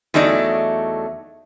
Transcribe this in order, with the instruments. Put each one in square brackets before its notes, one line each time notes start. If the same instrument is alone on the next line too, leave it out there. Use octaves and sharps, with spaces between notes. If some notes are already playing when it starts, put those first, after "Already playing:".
[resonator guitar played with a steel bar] E2 F#3 A3 D#4 D5